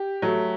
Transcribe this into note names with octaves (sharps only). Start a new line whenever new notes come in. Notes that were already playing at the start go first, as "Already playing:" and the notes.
Already playing: G4
F#3 A3